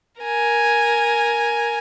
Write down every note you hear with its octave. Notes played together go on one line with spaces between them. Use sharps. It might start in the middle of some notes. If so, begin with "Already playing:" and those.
A#4 G#5